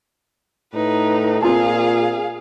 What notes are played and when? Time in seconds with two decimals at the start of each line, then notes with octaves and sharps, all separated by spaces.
0.74 A2 D#4 B4
1.43 A#2 C4 F4 G#4 F5 A5